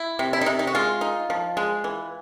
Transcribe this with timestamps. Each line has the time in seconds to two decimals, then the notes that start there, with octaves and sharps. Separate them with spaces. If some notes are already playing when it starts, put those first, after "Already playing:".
Already playing: E4
0.19 C3
0.33 E4
0.41 D#4
0.46 C3
0.59 D#4
0.67 F#4
0.75 G#3 F4
1.01 D#4
1.30 F3
1.57 G#3
1.84 E3